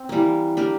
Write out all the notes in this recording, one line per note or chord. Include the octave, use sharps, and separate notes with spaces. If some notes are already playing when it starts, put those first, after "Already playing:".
Already playing: C4
E3 G3 A#3
A#3 D4 G4 A#4